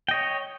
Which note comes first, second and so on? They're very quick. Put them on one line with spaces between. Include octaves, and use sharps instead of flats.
G5 D#5 C#5